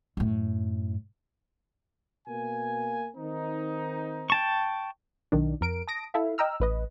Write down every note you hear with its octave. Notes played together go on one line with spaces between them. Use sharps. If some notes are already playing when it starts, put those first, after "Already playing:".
F#2 A2
B2 A#3 G#5
D#3 C4 D#4
G5 A5 C#6
B1 D#3 D4
F2 A#4 D7
A5 D#6 A#6 D7
E4 A4 E5 F5
D#5 G5 A#5 E6 F6
A1 B4 D#5